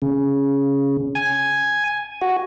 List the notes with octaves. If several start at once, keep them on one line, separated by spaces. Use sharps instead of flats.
C#3
G#5
F#4